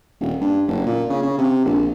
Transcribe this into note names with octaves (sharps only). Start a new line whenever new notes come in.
D#1
G2
F#1
A#2
C#3
C#3
C3
A#1